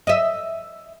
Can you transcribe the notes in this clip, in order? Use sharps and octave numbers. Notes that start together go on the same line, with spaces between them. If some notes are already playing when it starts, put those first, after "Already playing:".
D#5 E5